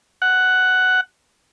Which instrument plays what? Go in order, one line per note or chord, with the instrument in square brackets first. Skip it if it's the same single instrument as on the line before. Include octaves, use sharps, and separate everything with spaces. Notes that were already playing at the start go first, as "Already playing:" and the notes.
[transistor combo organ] F#5